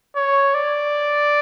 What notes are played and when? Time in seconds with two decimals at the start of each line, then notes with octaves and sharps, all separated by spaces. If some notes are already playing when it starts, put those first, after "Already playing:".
0.16 C#5
0.54 D5